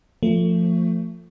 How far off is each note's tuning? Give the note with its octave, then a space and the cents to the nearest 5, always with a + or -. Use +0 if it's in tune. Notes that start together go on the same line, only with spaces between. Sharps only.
F3 +0 A3 +25